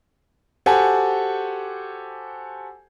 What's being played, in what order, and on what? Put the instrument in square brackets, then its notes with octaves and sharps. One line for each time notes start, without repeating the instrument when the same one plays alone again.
[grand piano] F#4 G4 A4 C5 F#5 G#5